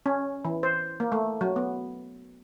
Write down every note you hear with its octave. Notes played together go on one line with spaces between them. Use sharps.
C#4
E3
C5
A#3
A3
F#3
B3